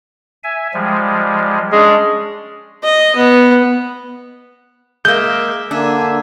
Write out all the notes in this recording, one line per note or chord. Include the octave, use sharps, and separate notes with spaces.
E5 G#5
F3 G3 G#3
G#3 C#4 D4
D#5
B3
G#3 A#3 E5 D6 G6
D3 A#3 D4 E5 G#5